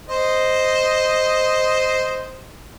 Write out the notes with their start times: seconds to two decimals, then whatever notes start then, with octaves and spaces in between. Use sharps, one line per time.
0.09 C5 D#5